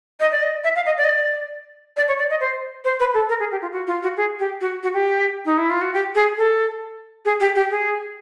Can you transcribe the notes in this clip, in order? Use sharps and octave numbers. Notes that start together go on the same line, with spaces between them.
D#5
D5
D#5
E5
F5
D#5
D5
D#5
D5
D5
C#5
D5
D#5
C5
C5
B4
A4
A#4
G#4
G4
F4
F#4
F4
F#4
G#4
G4
F#4
F#4
G4
D#4
E4
F4
F#4
G4
G#4
A4
G#4
G4
G4
G#4